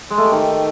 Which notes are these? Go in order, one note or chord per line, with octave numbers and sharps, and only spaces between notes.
G#3
A3
G4
D#3